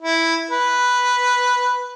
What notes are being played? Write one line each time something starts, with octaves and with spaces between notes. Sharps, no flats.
E4
B4